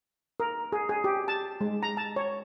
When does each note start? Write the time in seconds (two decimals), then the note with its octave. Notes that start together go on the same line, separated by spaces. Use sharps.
0.40 A#4
0.72 G#4
0.89 G#4
1.04 G4
1.28 A5
1.61 G#3
1.83 A#5
1.97 A5
2.16 C#5